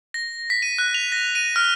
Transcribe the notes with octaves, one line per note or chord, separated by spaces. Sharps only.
A#6
B6
D#7
F#6
F7
A#6
D#7
F6